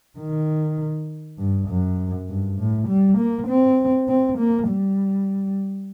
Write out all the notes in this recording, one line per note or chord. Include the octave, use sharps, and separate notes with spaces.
D#3
G2
F#2
G2
A2
G3
A#3
C4
C4
A#3
G3